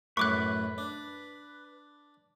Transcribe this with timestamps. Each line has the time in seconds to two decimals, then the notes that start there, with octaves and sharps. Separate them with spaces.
0.17 F#2 A2 B4 C#6 D6 F#6
0.78 D4